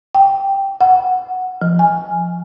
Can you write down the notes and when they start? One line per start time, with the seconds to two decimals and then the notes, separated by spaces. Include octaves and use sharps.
0.15 G5
0.81 F#5
1.62 F3
1.79 G#5